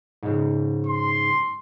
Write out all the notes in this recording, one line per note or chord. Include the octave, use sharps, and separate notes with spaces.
G#2 C#3
C6